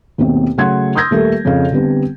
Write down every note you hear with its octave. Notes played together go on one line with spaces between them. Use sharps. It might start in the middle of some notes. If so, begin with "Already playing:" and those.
D#2 B2 A3 C4
C#3 F#3 A3 F#5 C6 G#6
C6 D#6 E6 G6 G#6 A#6
D#1 A3 G4 A4 A#4 E5
F2 C#3 A4 F5
D3 G3 B3 C4